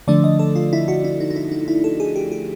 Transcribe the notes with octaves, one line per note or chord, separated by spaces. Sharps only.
D3 F3 A3 D4 D5
D#5
A4
F4
E4
F#4
E4
D#4
D#4
E4
D#4
E4
A4
G#4
G4
G4